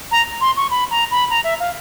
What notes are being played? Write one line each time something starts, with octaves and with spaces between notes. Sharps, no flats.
A#5
C6
C#6
B5
A#5
B5
A#5
E5
F5